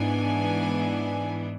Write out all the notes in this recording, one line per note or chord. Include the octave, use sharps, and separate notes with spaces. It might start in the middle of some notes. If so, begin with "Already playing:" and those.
Already playing: G#2 E3 B3 D4 G#5